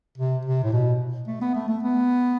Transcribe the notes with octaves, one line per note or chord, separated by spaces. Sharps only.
C3
C3
A2
B2
A3
B3
A3
A3
B3